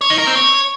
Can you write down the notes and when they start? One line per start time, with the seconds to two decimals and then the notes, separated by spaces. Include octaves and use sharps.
0.01 C#5
0.10 D#4
0.18 A#4
0.27 C4
0.36 C#5